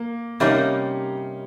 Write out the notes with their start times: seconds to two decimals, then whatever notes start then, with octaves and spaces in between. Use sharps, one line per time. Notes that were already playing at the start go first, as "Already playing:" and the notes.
Already playing: A#3
0.40 C3 G3 A#3 C#4 D#4